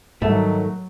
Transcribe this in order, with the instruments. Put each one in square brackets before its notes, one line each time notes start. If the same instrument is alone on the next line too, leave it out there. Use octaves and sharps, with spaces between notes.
[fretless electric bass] G#2 G3 [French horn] D#3 [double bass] F#3 [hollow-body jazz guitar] A3